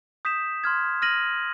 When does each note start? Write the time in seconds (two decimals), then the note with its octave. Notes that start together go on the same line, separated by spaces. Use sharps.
0.25 D#6 G6 B6 E7
0.64 C6 F6 G#6
1.02 F6 A#6 D#7 F#7